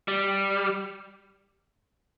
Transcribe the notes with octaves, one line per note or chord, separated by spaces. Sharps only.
G3